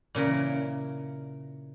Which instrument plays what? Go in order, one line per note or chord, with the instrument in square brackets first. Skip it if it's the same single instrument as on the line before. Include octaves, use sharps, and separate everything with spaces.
[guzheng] A#2 C#3 E3 A#4